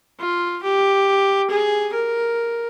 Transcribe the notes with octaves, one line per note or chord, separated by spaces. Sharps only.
F4
G4
G#4
A#4